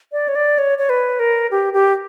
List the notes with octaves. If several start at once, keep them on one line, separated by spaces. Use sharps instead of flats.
D5
C#5
D5
C#5
C#5
B4
A#4
G4
G4